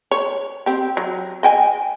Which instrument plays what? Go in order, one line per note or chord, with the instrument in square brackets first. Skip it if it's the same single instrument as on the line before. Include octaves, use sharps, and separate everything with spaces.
[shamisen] C#5
C4 G4
F#3
D#5 G5 G#5